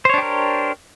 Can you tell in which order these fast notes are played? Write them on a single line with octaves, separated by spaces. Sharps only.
C5 C#5 D4 G4 A#4